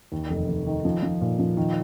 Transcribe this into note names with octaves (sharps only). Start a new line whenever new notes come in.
D#2
F1
F1
D#3
F3
F3
A#2
F3
D#3